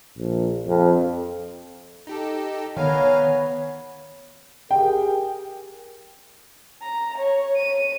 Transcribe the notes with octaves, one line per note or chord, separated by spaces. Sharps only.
A#1
F2
D#4 G4 A4
D#3 B3 C#5 F5 G#5 A#5
G4 G#4 A#4 G5
A#5
C#5
D#7